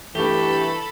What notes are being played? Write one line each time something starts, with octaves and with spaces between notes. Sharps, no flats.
G2 E3 A3 G4 A4 B5